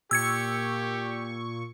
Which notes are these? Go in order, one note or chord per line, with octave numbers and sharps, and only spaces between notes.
A#2 G4 C#6 E6 G#6 C#7